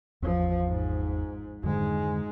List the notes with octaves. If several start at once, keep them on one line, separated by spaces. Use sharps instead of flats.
G#1 E2 F3
G#2
F2 G#2 D3 D#3 G#3